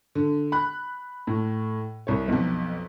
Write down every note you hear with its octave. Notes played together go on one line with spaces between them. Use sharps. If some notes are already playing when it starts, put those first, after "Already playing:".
D3
B5 F#6
A2
C2 C#5
B1 F2